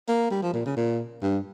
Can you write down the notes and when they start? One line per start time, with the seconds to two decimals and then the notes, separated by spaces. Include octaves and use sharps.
0.08 A#3
0.31 G3
0.42 F3
0.53 A#2
0.65 C#3
0.76 A#2
1.22 G2